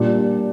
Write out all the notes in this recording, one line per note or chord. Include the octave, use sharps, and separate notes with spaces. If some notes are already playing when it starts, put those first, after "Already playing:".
Already playing: A#2 G3 D4 D5